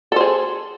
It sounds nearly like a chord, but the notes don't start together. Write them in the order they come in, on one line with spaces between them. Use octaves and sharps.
A4 C5 G#4